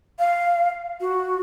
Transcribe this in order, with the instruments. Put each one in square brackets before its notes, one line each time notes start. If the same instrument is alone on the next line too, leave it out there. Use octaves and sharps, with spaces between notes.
[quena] F5
F#4